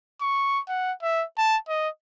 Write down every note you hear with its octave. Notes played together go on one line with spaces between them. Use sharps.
C#6
F#5
E5
A5
D#5